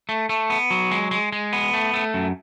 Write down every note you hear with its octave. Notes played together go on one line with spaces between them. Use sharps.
A3
A3
B3
F#3
G#3
G#3
G#3
B3
A3
A3
F#2